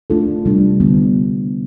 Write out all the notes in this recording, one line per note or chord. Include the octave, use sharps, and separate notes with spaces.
A3 D4 F4 A4
C3 G3 D4
D3 G3 B3